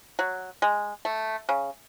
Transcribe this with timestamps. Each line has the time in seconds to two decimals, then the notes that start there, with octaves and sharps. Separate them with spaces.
0.19 F#3
0.62 G#3
1.05 A3
1.49 C#3